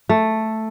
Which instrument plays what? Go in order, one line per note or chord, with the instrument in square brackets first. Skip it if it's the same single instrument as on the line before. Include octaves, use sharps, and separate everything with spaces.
[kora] A3